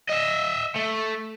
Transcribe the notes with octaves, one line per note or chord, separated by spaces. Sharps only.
D#5 E5
A3